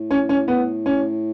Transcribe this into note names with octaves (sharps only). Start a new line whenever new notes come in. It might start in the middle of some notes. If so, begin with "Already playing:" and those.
Already playing: A2
C#4
C#4
B3
C#4